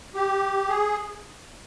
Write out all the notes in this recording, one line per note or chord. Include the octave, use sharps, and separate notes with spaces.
G4
G#4